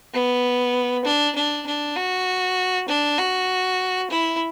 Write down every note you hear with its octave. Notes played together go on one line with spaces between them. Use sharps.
B3
D4
D4
D4
F#4
D4
F#4
E4